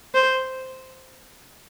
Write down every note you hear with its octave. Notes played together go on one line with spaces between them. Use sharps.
C5